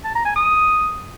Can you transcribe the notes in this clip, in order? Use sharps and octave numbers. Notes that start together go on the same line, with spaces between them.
A5
A#5
G#5
D#6